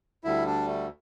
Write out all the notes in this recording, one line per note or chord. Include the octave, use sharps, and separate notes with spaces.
D2 D3 G3 E4
D4
A3